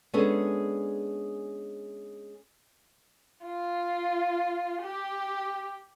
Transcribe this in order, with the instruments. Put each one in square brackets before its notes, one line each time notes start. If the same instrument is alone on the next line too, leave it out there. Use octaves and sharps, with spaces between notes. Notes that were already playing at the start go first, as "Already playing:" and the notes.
[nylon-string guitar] G#3 B3 C#4 D4 G#4 A4
[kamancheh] F4
G4